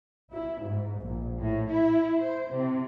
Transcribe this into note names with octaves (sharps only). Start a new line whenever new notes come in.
E4
G#2
A#1
A2
E4
C5
C3